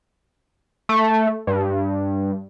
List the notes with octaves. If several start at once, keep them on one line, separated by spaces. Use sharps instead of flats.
A3
G2